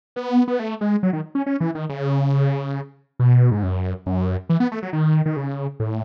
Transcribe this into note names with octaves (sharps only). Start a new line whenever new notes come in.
B3
B3
A3
G#3
F#3
D#3
C#4
C#4
E3
D#3
C#3
B2
G#2
F#2
F#2
E3
B3
A3
F#3
D#3
D#3
C#3
A2